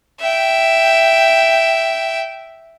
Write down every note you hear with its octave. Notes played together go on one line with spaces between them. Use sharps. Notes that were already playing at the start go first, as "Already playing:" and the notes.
E5 G5